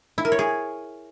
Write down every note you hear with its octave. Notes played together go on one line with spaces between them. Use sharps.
E4
A#4
C#5
G#4